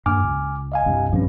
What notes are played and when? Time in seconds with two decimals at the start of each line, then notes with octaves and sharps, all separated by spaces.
0.06 G2 A#3 G#5 D6 F6
0.24 C#2
0.72 D#5 F5 G#5
0.86 C2 G2
1.13 B1 G2 F3 C4 C#4